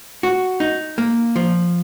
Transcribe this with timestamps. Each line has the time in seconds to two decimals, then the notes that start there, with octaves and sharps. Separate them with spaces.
0.23 F#4
0.60 D#4
0.98 A#3
1.36 F3